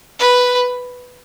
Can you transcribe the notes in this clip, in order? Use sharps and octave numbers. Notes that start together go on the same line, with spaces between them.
B4